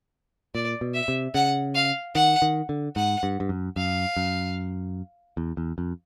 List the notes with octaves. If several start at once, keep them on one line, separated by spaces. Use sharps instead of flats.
A#2 D5
B2
E5
C3
C#3 F#5
F5
D#3 F#5
D#3
D3
G#2 F#5
G2
G2
F#2
F#2 F5
F#2
E2
E2
F2